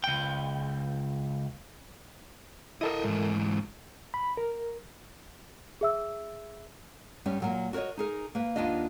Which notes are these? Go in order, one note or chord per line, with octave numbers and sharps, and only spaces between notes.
C#2 G5
E4 A4 A#4 D#5 E5
G#2 E3
B5
A#4
G#4 E5 E6
G2 G3 B3 C#4
A#2 F#3 A#3
F#4 A#4 C5 C#5 D#5
D#4 G#4 A#4
A#3 B4
D#2 A#3 B3 D4 F4 D#5